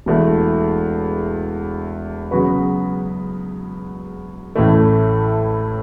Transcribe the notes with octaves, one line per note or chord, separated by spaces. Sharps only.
E1 E2 E3 A3
C#3 F#3 B3 F#4 B4
A1 A2 E3 A3